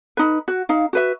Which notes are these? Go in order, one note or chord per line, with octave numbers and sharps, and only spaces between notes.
D#4 B4
F#4
D#4 F5
F#4 B4 E5